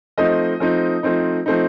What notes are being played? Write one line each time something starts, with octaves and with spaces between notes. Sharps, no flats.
F3 A3 C4 D#4 D#5
F3 A3 C4 D#4
F3 A3 C4 D#4
F3 A3 C4 D#4